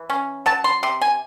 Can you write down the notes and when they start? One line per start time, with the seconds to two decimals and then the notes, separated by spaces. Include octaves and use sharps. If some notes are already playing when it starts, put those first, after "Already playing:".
Already playing: E3
0.10 C#4
0.46 F#3 A5
0.64 C6
0.83 C3 C6
1.02 G#5